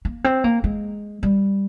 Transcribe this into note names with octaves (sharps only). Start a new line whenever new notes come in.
A#3
C4
A#3
G#3
G3